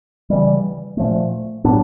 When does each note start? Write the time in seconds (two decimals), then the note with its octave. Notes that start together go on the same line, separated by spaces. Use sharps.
0.30 C#3 E3 G3
0.97 A#2 F3 A3
1.64 A2 F#3 B3 D4